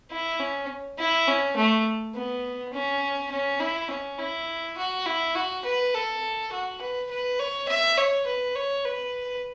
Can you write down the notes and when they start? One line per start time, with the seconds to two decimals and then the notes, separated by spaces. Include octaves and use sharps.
0.11 E4
0.40 C#4
0.99 E4
1.28 C#4
1.57 A3
2.15 B3
2.73 C#4
3.32 C#4
3.60 E4
3.90 C#4
4.19 E4
4.77 F#4
5.06 E4
5.35 F#4
5.65 B4
5.94 A4
6.52 F#4
6.81 B4
7.11 B4
7.40 C#5
7.69 E5
7.97 C#5
8.27 B4
8.56 C#5
8.85 B4